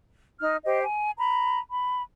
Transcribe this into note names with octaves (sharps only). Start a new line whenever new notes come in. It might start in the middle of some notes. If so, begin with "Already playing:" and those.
D#4 F6
G4 C5 D#5
G#5
A#5 B5
B5